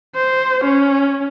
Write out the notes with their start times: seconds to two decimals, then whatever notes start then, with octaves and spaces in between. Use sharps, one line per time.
0.15 C5
0.64 C#4